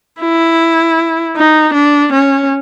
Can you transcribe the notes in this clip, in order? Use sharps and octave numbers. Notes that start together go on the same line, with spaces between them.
E4
D#4
D4
C#4